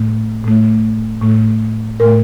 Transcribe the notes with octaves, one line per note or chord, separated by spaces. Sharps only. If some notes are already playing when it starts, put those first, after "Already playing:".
Already playing: A2 A3
A2 A3
A2 A3
A2 A3 A#4